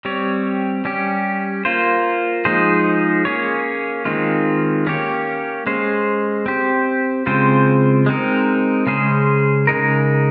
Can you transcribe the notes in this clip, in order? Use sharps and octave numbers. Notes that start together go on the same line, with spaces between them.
G3 C4 G4 C#5
G3 C#4 G4
A#3 F4 C5
F3 G#3 D#4 G#4 C5
A#3 C#4 G#4 C#5
D#3 G#3 C4 F4
A#3 C#4 G4 C#5
G#3 C#4 G#4 C5
C4 G4 C5
C#3 G#3 C4 F4 C5
G#3 C4 D#4 A#4
C#3 G#3 C#4 G#4 C5
C#3 G#3 D#4 A#4